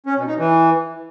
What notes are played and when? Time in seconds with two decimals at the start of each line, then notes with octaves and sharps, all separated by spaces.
0.06 C#4
0.17 B2
0.27 D#4
0.38 E3